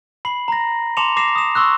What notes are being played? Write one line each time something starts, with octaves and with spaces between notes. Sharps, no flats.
B5 C7 F#7
A#5 A#6
A5 C6 D6 C#7 E7 F7
D6 A#6 C7 E7
D#6 E7
C6 C#6 E6 F#6